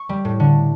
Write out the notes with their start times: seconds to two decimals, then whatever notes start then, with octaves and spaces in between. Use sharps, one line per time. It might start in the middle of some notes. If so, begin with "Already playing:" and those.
Already playing: C#6
0.09 G3
0.25 A2
0.40 D3